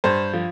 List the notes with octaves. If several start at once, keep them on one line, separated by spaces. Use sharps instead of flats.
G2 C5
F3